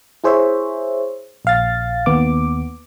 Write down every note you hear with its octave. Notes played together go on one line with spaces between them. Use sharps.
E4 G#4 C5 C#5 E5
A#1 F5 A6
D#2 B3 D6